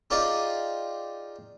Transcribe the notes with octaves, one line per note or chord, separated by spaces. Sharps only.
D#4 F4 G4 G#4 D5